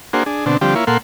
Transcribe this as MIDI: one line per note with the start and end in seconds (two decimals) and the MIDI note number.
0.13 0.23 58
0.13 0.23 62
0.13 0.23 66
0.13 0.23 68
0.13 0.23 72
0.26 0.45 62
0.26 0.45 68
0.46 0.57 47
0.46 0.57 50
0.46 0.57 60
0.46 0.57 62
0.61 0.74 50
0.61 0.74 53
0.61 0.74 55
0.61 0.74 60
0.61 0.74 67
0.75 0.85 58
0.75 0.85 64
0.75 0.85 65
0.75 0.85 73
0.87 0.98 46
0.87 0.98 58
0.87 0.98 69
0.87 0.98 78
0.87 0.98 84